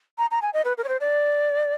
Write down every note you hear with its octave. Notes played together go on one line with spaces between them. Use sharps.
A#5
A#5
G#5
D#5
B4
A#4
C#5
C5
D5